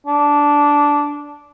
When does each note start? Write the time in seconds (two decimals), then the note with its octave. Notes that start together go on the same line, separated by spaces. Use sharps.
0.06 D4